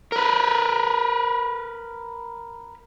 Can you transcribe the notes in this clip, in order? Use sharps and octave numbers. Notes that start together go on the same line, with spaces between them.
A#4 B4